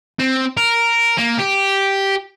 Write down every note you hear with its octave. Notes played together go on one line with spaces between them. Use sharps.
C4
A#4
A#3
G4